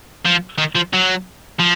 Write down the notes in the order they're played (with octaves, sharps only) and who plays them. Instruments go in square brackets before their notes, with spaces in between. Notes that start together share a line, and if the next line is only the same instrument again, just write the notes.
[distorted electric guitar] F3
D#3
F3
F#3
F3